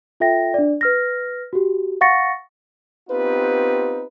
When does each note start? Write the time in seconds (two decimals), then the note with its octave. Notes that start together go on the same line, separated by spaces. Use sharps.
0.20 F4 A4 E5 G5 A#6
0.54 D4 D5
0.81 B4 F6 A#6
1.53 F#4 G4
2.01 F5 F#5 C#6 A6 A#6 C#7
3.09 B3 C4 D#4 F4 G4 B4